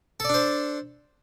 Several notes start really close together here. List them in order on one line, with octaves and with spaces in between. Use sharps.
A4 D5 D4 C5